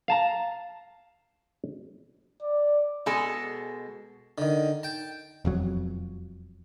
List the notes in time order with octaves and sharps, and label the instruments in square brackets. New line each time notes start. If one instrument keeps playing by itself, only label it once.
[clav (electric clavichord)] F5 A5 A#5
[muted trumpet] D5
[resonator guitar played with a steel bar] B2 G#3 A4 G#5
[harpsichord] D3 D#3
G5 A5
[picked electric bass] E1 F2 F#3